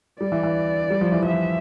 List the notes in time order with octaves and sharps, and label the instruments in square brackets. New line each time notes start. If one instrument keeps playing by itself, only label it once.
[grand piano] G3 [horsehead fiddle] D5
[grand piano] E3
E3
G3
F3
E3
[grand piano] F3 [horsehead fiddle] E5